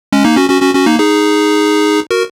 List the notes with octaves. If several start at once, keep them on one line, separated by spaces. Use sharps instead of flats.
G#3 C#4
A#3 D#4
C#4 F#4
C#4 F#4
C#4 F#4
C#4 F#4
A#3 D#4
D#4 G#4
F#4 A#4